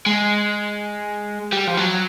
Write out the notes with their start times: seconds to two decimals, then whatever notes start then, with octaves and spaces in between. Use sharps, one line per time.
0.06 G#3
1.53 G3
1.67 F3
1.77 F#3